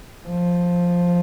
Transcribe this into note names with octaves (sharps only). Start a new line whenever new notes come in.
F3